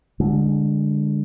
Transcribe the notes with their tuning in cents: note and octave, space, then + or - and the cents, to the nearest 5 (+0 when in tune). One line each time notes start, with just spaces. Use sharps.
D3 -5 G#3 -30